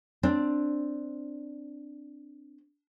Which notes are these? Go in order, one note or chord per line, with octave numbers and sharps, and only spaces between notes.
C4 D4